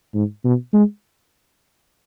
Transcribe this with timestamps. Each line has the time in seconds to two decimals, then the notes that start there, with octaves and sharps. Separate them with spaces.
0.14 G#2
0.44 B2
0.73 G#3